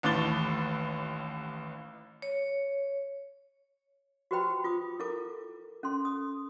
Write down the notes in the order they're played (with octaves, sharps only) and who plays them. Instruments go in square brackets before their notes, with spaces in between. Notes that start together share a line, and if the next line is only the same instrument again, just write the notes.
[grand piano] A1 D#2 A2 D6 A6 G7
[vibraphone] C#5
[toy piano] F#4 G4 B4 C5 G5 B5
F4 D6 D#6
E4 A4 A#4 D6
C#4 A4 C6
D#6